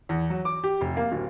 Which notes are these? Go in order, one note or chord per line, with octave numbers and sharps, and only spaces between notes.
E2
F#3
D6
G4
F1
A#3
D1